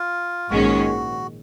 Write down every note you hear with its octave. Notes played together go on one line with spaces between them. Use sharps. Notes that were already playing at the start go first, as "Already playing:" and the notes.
Already playing: F4
A#1 G#2 D#3 G#3 C#4 F#4